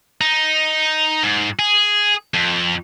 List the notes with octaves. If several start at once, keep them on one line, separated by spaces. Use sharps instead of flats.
D#4
G#2
G#4
F2